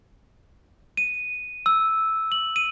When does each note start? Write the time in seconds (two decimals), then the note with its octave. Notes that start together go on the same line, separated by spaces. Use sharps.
0.97 D#7
1.66 E6
2.32 F#7
2.56 D#7